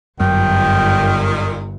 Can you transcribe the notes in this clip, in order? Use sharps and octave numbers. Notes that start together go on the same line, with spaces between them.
G1 F#2 A#2 D#3 G5